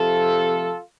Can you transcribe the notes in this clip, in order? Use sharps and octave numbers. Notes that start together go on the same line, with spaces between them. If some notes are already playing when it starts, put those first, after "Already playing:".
Already playing: C3 F3 A3 F4 A4